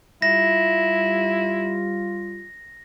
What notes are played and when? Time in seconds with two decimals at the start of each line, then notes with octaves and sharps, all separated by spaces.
0.22 G3 E4 F4 A#6